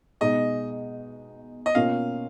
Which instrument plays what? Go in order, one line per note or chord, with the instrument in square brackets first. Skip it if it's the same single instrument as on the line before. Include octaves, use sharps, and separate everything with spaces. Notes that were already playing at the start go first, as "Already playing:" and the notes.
[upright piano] B2 G#3 D#4 [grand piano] D#5
[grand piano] D#5
[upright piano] B2 A#3 C#4 F4 [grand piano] F5